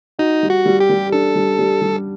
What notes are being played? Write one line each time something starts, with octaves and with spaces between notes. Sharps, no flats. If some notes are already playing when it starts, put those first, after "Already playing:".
D#4 F#4
G3
F#4
G3
G4
G3
D4 A4
G3
G3
G3